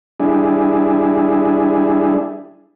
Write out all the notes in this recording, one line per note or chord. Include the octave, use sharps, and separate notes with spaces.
G3 D4 E4 G#4